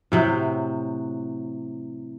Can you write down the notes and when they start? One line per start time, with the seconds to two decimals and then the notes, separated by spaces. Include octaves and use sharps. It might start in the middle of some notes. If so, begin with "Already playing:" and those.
0.12 A2 C3 F#3